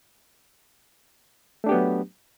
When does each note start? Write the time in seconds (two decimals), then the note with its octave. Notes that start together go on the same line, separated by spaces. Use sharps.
1.64 A3
1.66 D4
1.69 G4
1.71 B3
1.74 F#3